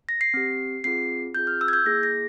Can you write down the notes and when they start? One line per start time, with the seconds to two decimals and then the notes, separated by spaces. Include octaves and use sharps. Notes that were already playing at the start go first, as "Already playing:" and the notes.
0.09 A#6
0.21 C7
0.34 C4 G4
0.84 C4 F4 G#4 C7
1.34 C4 F4 G#4 G6
1.47 F6
1.61 E6
1.68 G#6
1.73 G6
1.86 A#3 E4 G#4 A#6
2.03 A#6